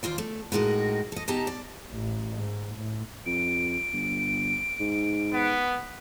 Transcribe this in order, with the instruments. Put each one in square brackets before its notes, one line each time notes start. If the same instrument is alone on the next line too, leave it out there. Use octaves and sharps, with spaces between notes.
[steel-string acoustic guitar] D#2 F4 C5 D5
A3
A2 G#3 D#4 F#4 A#4
A4 D#5
B2 D#4 G4 D#5 A5 A#5
D5
[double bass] A1
G#2
A2
[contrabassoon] F2 [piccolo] D7
[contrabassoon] G1
G#2
[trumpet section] B3